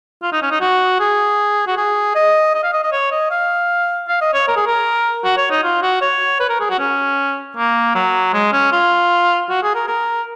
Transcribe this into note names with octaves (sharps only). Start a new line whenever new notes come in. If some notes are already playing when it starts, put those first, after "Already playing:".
F4
D#4
C#4
D#4
F#4
G#4
F#4
G#4
D#5
D#5
F5
D#5
D#5
C#5
D#5
F5
F5
D#5
C#5
A#4
G#4
A#4
F#4
C#5
D#4
F4
F#4
C#5
B4
A#4
G#4
F#4
C#4
A#3
F#3
G#3
C#4
F4
F#4
G#4
A#4
A#4